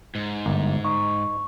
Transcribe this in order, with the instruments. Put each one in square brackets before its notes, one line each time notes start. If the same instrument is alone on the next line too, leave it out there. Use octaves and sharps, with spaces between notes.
[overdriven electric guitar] G#2
[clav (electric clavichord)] G1 A#3
[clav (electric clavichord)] D#4 [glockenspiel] C#6